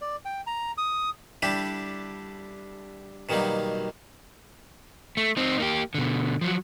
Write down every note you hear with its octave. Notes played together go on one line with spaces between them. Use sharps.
D5
G5
A#5
D#6
D3 G3 D4 E4 G4
B2 D#3 F#3 G3 A#3
A3
C4 D#4
A#3 G4
B2 D3
F3 F#3